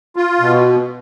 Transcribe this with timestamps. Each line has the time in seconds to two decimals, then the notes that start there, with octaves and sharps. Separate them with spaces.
0.16 F4
0.40 B2